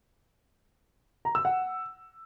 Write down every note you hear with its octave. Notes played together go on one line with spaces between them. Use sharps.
A#5
E6
F#5